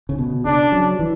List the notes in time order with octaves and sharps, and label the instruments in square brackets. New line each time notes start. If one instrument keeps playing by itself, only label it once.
[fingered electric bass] C#3
B2
[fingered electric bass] C#3 [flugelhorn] D4
[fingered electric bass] F#3
E3